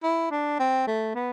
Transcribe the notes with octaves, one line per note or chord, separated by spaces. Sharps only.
E4
D4
C4
A3
B3